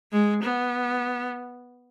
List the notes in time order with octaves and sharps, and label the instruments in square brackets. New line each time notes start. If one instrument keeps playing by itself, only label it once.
[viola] G#3
B3